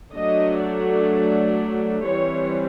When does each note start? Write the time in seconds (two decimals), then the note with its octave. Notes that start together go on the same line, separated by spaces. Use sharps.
0.14 F#3 A3 D4 D#5
0.62 D5
2.04 E3 G3 C4 C#5